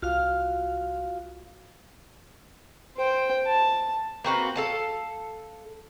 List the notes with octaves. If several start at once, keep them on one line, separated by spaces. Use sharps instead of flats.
C2 F4 F#4 F5 F6
C5 G5
A5
A#3 C4 F#4 B4
A4 F5 A5